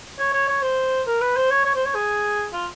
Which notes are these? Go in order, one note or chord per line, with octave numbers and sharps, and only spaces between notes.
C#5
C#5
C#5
C5
A#4
B4
C5
C#5
C#5
C5
C#5
G#4
F4